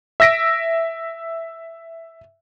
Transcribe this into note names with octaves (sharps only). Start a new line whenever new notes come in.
E5 E6 A#6 B6 D7